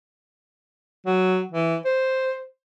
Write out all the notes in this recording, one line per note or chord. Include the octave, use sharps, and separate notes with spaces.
F#3
E3
C5